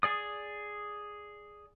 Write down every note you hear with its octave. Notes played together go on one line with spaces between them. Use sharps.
G#4 D5 D#6